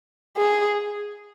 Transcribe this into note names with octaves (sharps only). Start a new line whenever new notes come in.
G#4